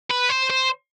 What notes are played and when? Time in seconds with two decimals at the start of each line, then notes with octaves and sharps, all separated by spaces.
0.10 B4
0.29 C5
0.50 C5